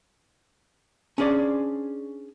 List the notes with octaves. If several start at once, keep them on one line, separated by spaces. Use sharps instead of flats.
C#4 D4 G#4 C5 D5